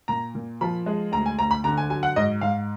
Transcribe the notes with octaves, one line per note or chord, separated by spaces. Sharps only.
A#2 A#5
A#2
F3 B5
G#3
D2 A#5
G#5
D2 A#5
B5
D3 A#5
G#5
F#3 G#5
F#5
G#2 D#5
G#2 F5